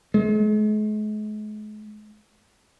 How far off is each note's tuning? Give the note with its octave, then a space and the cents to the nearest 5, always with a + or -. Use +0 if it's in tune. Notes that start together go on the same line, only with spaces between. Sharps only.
G#3 +40